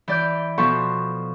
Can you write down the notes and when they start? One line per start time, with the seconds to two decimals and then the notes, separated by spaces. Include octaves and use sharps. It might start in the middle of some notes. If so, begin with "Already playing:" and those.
0.08 E3 D5 G6
0.58 B2 F3 A4 B4 C#6